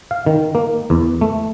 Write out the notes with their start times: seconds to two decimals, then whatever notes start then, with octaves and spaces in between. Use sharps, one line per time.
0.11 F5
0.26 D#3
0.55 A#3
0.90 E2
1.21 A3